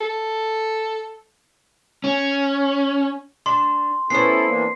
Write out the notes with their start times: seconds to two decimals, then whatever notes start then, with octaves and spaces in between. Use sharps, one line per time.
0.01 A4
2.04 C#4
3.46 D4 C6
4.10 B3 C#4 E4 A4 C5 C7
4.47 E3 A#3 D4